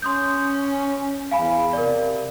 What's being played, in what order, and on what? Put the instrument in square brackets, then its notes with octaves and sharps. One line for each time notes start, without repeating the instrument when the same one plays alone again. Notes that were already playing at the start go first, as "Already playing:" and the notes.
[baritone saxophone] C#4 [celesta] C6 D#6 G6
[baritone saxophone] E2 [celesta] F5 G#5 B5
[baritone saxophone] C3 [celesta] A#4 D5